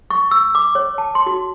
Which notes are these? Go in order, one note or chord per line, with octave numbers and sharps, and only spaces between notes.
C#6
E6
D6
C#5
A5
C6
F#4